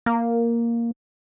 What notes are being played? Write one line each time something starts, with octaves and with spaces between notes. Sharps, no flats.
A#3